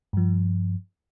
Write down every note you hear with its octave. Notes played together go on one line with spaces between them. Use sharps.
G2 F3